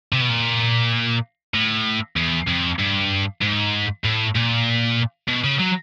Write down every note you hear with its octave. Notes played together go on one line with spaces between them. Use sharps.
C3
B2
A#2
A2
E2
F2
G2
G#2
A2
A#2
B2
C#3
F#3